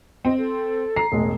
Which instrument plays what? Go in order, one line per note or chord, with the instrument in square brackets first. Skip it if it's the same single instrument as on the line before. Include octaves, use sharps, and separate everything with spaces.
[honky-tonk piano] C4 [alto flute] D#5
[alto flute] A4
[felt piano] A#5 [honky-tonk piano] C7
[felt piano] E1 A1 [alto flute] G#3